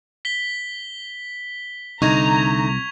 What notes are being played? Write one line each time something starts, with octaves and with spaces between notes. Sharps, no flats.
B6 G7
C2 D3 A3 D#4 A#5 C#6 G#6 F7